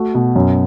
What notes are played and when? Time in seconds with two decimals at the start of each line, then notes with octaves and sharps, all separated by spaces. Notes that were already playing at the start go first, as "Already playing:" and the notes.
Already playing: A3 F#4
0.15 B2
0.36 F#2